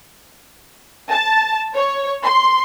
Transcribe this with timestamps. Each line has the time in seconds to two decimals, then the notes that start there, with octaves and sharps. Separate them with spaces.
1.10 A5
1.75 C#5
2.24 C6